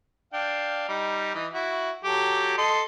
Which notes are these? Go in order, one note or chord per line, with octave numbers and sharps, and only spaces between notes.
D4 F5 G5
G3 D#4
E3 D#5
E4 F#4
F#3 G4 A4
A4 D#5 C6